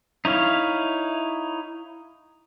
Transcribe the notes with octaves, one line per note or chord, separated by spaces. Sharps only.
D#4 E4 C#5 F5